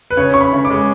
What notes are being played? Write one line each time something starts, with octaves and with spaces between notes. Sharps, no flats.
B4
C#3 C#5
C#4 C#6
B5
C#3
D6
G#3